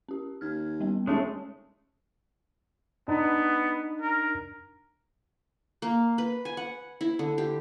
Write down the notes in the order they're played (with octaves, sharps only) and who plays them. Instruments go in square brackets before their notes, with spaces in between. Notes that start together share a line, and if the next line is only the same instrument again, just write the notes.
[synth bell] C#4 G4
[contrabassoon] D#2 [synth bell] F6 G#6
[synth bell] G3 B3 C#4
[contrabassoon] D#2 [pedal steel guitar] G#3 A3 [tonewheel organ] C#4
[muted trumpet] B3 [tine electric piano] D4 D#4
[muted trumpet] A#4
[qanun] A#3
B4
G#5
F#5
E4
D3
G4